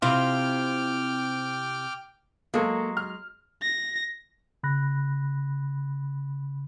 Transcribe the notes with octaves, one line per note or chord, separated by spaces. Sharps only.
C3 C4 E4 F4 G5 D6 F6
F#3 G#3 A#3 A4
F6
A#6
C#3 B5 F#6 A#6